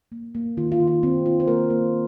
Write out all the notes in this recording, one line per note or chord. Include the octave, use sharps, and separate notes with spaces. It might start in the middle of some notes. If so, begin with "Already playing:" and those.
A#3
A#3
D#3 F4
F4
D#3
F4
D#3 C4
A#3 F4
C5
A#3 A#4
A#3